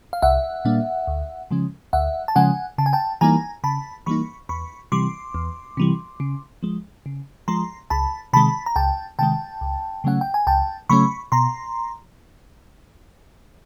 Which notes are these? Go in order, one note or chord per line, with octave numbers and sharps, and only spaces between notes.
F5
C2 E5 F#5
A#2 G3 A#3 D4
D2
C#3 F3 G#3 C#4
D2 E5 F#5
A5
C#3 F3 G#3 C#4 F#5 G#5
C#3 A5
G#5
G5 A5
E3 G3 A#3 D#4 G#5 A#5
C#3 A5 B5
E3 G3 A#3 D#4 B5 C#6
E2 B5 C#6
C3 E3 G3 C6 D6
E2
C3 E3 G3
C#3
F3 G#3
C#3
F3 G#3 A#5 C6
C#2 A5 B5
C3 D#3 G#3 A5 B5
A#5
C#2 G5 A5
C3 D#3 G#3 G5 A5
C#2
C#3 F#3 A3 C#4 F#5
G5
G#5
C#2 G5 A5
C#3 F#3 A3 C#4 B5 C#6
B2 A#5 C6